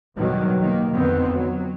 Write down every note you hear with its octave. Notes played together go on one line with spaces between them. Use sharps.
E2 B2 D3 D#3 F#3 G3
D#3 A#3
F2 D3 D#3 B3 C4
F#3